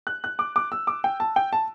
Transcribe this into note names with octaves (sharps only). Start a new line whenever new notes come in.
F#6
F#6
D6
D6
E6
D6
G5
A5
G5
A5